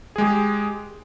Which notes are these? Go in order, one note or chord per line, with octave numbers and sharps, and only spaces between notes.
G#3 G4 G#4